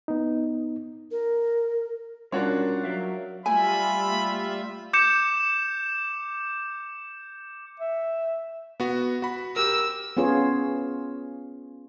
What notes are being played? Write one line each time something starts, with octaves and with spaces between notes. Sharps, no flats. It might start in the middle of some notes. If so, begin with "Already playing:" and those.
B3 D#4
A#4
G3 C#4 D4 F4 F#4 A#4 C#5
F#3 A#4 E5 F5
G3 A3 F4 E5 G#5 B5
D6 G6 C#7 E7
E5
B3 F#4
F#4 B5
G4 A#4 E6
B3 C#4 F4 G#4 C#5